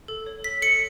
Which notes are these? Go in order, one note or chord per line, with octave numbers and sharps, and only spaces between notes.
A4
C#5
A4 B6
A4 C#7